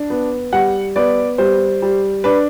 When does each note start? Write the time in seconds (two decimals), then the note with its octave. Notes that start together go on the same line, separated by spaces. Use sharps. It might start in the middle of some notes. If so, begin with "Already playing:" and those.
Already playing: D4
0.10 B3
0.53 G3 F#5
0.96 B3 D5
1.38 G3 C5
1.82 G3
2.24 D4 B4